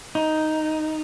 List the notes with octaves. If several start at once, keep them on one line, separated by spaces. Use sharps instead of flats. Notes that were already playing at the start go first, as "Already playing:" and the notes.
D#4